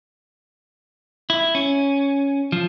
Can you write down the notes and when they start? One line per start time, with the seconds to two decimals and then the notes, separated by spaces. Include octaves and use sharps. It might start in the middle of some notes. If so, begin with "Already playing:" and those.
1.30 E4
1.55 C#4
2.52 F3